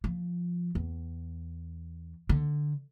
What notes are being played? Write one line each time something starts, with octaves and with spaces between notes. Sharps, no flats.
F3
E2
D3